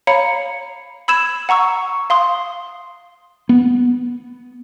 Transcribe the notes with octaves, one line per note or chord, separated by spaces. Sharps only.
C#5 F5 A#5 B5 C#7
B5 E6 G#6 E7
F#5 A#5 C#6 E6
F5 C6 D#6
B3